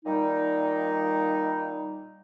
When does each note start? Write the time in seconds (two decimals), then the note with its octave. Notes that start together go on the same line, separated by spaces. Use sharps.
0.04 A#2 D#3 G3 D#4